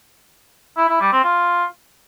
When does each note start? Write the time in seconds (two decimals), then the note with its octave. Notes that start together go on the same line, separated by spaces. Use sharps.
0.77 E4
0.89 E4
1.00 G3
1.12 C4
1.24 F4